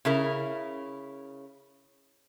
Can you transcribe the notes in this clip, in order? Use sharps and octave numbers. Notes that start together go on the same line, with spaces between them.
C#3 E4 A#4